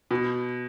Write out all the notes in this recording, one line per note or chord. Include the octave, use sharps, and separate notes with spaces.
B2